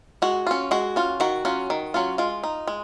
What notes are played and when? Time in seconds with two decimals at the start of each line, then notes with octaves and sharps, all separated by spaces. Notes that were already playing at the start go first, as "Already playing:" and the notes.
0.22 G#3 F#4
0.47 C#4 F4
0.71 G#3 F#4
0.96 C#4 F4
1.20 D#3 F#4
1.45 F#3 C#4 F4
1.70 D#3
1.94 F#3 C#4 F4
2.18 G#3 F4
2.43 D#4
2.68 G#3